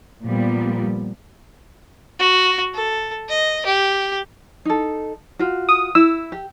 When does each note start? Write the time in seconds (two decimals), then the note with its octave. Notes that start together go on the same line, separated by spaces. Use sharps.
0.23 A#2 F3 G3 B3
2.19 F#4
2.74 A4
3.29 D#5
3.66 G4
4.65 D#4 A4
5.39 F4 F#4
5.69 D#6
5.95 E4 E6
6.32 G4